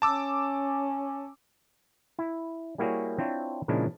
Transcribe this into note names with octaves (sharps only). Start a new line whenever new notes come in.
C#4 A5 D6 E6
E4
G3 A#3 E4 F#4 G#4 C#5
C4 D4 E4 F4 C5 C#5
A#2 C#3 F3 G#3 D4 E4